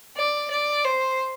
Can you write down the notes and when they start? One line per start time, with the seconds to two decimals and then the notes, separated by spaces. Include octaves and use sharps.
0.17 D5
0.51 D5
0.85 C5